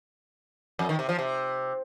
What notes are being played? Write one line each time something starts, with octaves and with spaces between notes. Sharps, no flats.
F2
D#3
C3
F3
C3